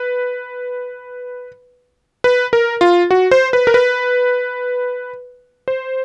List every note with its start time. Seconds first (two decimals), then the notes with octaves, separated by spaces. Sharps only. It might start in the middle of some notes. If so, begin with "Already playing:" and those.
Already playing: B4
2.24 B4
2.53 A#4
2.81 F4
3.11 F#4
3.31 C5
3.53 B4
3.67 A#4
3.74 B4
5.68 C5